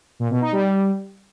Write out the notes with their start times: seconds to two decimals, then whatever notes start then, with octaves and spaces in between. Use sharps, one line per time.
0.19 A#2
0.30 B2
0.41 D#4
0.52 G3